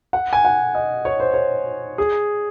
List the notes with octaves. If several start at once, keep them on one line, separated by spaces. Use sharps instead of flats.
F#5
G#5
F#5
D#5
C#5
C5
C#5
G#4